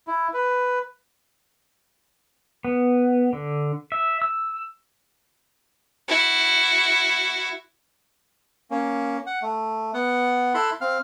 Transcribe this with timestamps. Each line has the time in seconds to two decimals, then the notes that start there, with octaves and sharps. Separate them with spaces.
0.08 E4
0.34 B4
2.65 B3
3.33 D3
3.92 E5
4.22 E6
6.08 E4 F#4
8.71 A#3 C#4
9.27 F#5
9.42 A3
9.94 B3 F#5
10.54 E4 A4 B5 C6 F#6
10.81 C4 F5 F6